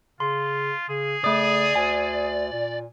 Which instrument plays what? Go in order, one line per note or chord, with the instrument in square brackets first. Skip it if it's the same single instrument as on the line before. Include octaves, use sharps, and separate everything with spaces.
[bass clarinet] C#3 [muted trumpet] F4 [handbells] C6
[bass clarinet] C#3 [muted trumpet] G#4
[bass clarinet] C#3 [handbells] A3 D#6 [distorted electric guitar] D5
[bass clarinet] D2 [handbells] G#5
[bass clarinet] A#2